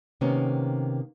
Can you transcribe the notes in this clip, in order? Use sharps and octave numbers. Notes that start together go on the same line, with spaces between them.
C3 D#3 A#3 B3 C#4